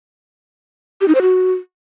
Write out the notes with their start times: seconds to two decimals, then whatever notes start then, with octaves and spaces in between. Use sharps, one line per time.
1.01 G4
1.08 D#4
1.15 C5
1.22 F#4